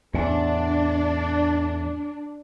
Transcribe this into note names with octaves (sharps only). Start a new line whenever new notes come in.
E2 A2 D4